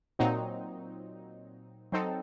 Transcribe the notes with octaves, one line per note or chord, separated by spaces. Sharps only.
A#2 F#3 C4 D#4
F#3 C4 D#4 A4